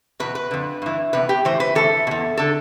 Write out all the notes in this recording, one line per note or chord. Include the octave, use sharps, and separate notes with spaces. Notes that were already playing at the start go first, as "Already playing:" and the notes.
E2 B2 B4
B4
F2 D3
G2 E3
E2 C3 B4
G4
A2 E3 C5
B4
A2 E3 A4
B2
E2
D3 A4